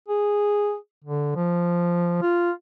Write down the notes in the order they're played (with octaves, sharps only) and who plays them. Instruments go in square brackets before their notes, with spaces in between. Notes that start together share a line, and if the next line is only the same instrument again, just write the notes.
[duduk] G#4
D3
F3
F4